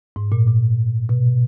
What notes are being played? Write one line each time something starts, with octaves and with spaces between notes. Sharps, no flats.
G#2
A#2
A#2
B2